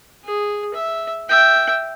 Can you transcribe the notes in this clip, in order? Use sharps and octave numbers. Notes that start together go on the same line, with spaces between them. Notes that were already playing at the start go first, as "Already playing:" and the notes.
G#4
E5
E5 G5